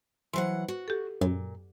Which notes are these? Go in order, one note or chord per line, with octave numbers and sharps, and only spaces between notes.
E3 F#3 C5 F#5 C6
F#4
G4 A4
F#2 A#2